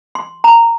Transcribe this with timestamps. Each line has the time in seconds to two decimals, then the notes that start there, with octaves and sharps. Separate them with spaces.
0.15 C6
0.44 A#5